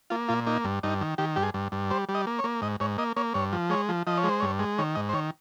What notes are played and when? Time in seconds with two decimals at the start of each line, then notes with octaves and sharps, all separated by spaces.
0.10 A#3 F4
0.28 A#2 F4
0.47 A#3 D#4
0.65 G2
0.83 G2 D#4
1.01 D#3
1.18 D#3 G4
1.36 G2 G4
1.43 G#4
1.54 G2
1.72 G2
1.91 G3 C5
2.09 G3
2.15 D#5
2.27 A#3
2.39 C#5
2.44 A#3
2.62 G#2 D#5
2.80 G#2 C#5
2.98 A#3 D#5
3.16 A#3 C#5
3.34 G2 C#5
3.53 F3
3.70 G#3 C#5
3.89 F3
4.07 F3 D#5
4.18 C#5
4.24 G#3
4.29 C5
4.40 G2 C#5
4.59 G#3
4.78 D#3 C#5
4.95 G#2 D#5
5.09 C5
5.13 D#3 C#5